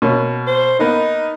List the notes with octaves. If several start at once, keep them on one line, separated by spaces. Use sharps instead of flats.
B2 A#3 C#4
C5
A#3 B3 D#4 A#4